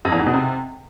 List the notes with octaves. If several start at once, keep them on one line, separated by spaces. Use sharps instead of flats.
F2
E2
G#2
B2
C3